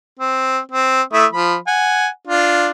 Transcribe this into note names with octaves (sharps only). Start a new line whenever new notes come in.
C4
C4
A3 E4 D#6
F3 B5
F#5 G#5
D4 F4